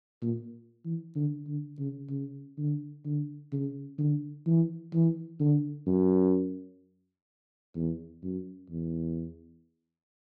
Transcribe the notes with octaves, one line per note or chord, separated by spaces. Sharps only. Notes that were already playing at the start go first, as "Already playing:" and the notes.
A#2
E3
D3
D3
C#3
C#3
D3
D3
C#3
D3
E3
E3
D3
F#2
E2
F#2
E2